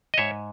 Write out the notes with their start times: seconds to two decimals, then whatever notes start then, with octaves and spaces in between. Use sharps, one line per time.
0.14 D#5
0.18 G#2 C#5 E5